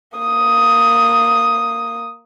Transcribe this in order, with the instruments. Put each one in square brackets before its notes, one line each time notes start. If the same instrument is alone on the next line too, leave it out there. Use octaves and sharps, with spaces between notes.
[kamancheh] A#3 D#6